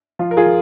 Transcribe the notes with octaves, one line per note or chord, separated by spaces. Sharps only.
F3 F4
A#4
F4 G#4
F3